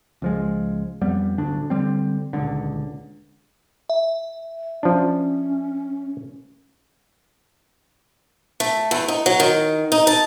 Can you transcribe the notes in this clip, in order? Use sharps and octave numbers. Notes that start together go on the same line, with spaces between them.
C#2 F3 G#3
F2 G3 B3
D1 G1 D2 D4
D3 F#3 G3 C4
D#1 C#2 D3
E5
F3 C#4 D4
A3
E2
D#4
F#3
D#3
D#4
A5